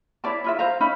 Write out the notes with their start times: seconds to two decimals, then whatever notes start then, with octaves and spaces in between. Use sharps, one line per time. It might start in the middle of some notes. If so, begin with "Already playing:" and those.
0.24 E4 C#5 D5 A5
0.44 E4 F4 E5
0.59 C5 F5 A#5
0.80 C#4 D#4 E5 B5